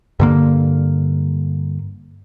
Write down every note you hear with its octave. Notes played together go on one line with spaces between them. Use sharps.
G2 D3 A#3